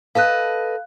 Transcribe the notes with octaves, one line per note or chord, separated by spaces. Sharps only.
A4 B4 D#5 F5 F#6